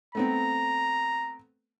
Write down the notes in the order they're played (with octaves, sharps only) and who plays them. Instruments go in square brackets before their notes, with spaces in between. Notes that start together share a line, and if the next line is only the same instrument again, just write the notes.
[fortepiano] A3 B3 C4 [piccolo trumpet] A#5